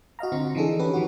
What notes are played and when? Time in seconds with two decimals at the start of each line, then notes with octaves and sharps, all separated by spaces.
0.19 F#4 D#5 F5 A#5
0.32 D3 C4 F4
0.55 E3 F3 D4 D#4 G#4 A4
0.79 C#4 G4 B4
0.94 E3 F#3 D#4 F#4